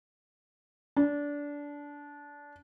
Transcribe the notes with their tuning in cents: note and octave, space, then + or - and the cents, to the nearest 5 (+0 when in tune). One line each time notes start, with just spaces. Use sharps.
D4 -20